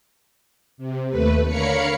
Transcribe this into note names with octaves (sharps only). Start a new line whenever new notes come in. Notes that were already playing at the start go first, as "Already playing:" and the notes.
C3
D#2 A3 B4
D3 A#4 C#5 F5 B5 C#7